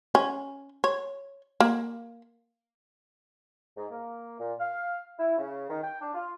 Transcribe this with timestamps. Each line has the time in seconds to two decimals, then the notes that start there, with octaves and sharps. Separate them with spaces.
0.15 C#4
0.84 C#5
1.60 A#3
3.77 G#2
3.91 A#3
4.40 A#2
4.60 F5
5.18 E4
5.38 C#3
5.69 D#3
5.82 G5
6.01 D4
6.14 F4